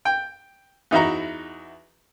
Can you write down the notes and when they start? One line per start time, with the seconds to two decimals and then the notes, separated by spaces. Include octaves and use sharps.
0.05 G5
0.91 E2 D#4 E4 F#4 A#5